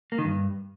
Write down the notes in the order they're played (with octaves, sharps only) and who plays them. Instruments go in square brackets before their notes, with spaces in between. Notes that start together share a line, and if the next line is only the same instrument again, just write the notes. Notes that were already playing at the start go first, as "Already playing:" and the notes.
[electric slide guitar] A#3
D#3
G2